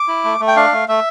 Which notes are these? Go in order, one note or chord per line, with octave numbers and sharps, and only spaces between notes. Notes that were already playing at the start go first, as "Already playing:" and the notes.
Already playing: D6
E4
A3
A3
G5
D4 F5
A3
A3 E5